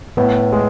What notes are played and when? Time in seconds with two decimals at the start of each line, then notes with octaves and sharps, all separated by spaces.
0.17 A2 B3
0.52 G#3